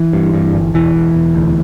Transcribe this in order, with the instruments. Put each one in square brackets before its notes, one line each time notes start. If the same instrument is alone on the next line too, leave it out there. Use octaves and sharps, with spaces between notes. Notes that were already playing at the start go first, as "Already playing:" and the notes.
Already playing: [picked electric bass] E3
G2
G2
G1
E1 E3
E1
E1
D2